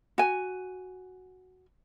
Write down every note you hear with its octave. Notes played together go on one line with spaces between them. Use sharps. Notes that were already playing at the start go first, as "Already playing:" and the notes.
F#4 G#5